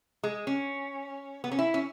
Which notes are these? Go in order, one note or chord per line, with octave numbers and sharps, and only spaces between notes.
G#3
C#4
B3
C#4
E4
C#4